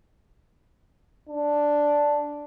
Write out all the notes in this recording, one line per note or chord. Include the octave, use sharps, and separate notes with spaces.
D4